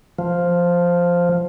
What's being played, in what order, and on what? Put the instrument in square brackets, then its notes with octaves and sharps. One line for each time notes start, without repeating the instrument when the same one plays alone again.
[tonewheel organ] F3